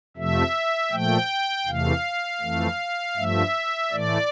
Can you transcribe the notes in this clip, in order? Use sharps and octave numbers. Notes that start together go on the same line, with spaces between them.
F2 C3 F3 A3 E5
A#2 F3 A3 G5
E2 C3 E3 A3 F5
F2 E3 A3
G2 F3 A3 E5
A2 E3 A3 D5